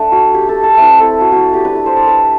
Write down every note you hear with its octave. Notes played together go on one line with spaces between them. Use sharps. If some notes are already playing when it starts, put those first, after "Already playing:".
Already playing: A3 D4
F#4
G4
A4
A4
A3 C4 E4 B4
A4
F#4
F#4
G4
A3 D4 B4
B4
C5
D5
B4